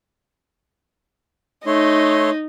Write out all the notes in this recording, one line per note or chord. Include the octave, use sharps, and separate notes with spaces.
A3 D#4 C#5 C6